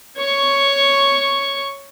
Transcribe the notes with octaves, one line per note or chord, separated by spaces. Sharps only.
C#5 C#6